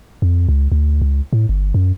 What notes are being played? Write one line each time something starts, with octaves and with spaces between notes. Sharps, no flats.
F2
C#2
D2
C#2
A2
G1
F#2